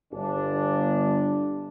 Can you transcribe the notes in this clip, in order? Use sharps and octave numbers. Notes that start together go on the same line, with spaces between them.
G1 D4